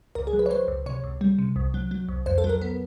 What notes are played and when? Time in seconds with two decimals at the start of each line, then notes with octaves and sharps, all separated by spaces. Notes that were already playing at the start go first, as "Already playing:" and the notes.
0.15 C#2 A#4
0.27 G#4
0.33 F#3
0.39 B4
0.46 C#5
0.51 F#3 C5
0.68 C#2
0.86 C3 C#5
1.04 C#2
1.21 G3
1.39 C3
1.56 C2
1.74 F#3
1.91 F#3
2.09 C2
2.26 F2 C5
2.38 A4
2.44 F#3
2.49 A#4
2.62 B3